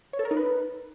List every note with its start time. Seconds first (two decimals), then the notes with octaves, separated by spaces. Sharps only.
0.13 C#5
0.19 A4
0.25 A#4
0.31 D#4
0.37 B4